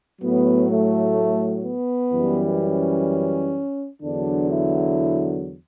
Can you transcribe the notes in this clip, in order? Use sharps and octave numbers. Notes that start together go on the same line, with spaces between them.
A2 F#3 B3
A3
B3
F#2 E3 G3
C#4
E2 D3 F#3 D4
E4